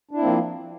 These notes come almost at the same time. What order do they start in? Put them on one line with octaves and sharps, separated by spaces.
D4 E4 C4 A#3 F3